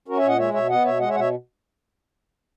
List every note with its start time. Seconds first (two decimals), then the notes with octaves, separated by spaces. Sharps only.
0.08 C#4 F#4 A#4
0.18 C#5 E5
0.23 A#2
0.28 D#5 F#5
0.38 G#3 C#5 E5
0.53 B2 C#5 E5
0.69 B3 D#5 F#5
0.84 B2 C#5 E5
1.00 G#3 D#5 F#5
1.09 C#5 E5
1.15 B2 F#5
1.19 C#5 E5